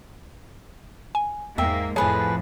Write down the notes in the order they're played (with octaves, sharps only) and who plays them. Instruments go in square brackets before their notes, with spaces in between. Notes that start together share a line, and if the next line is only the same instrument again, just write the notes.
[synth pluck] G#5
[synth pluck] E2 G5 [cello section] G#2 A#3 [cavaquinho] E5
[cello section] F2 A2 F3 [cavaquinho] G#4 B4 A5 [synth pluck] C#5 G#5